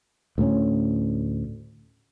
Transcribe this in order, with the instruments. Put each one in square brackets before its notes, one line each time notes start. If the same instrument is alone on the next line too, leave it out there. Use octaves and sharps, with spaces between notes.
[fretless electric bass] D2 A2 A3 C#4